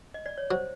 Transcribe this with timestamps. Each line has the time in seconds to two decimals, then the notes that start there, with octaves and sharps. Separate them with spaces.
0.14 D#5
0.26 D5
0.38 C#5
0.50 F#3 C5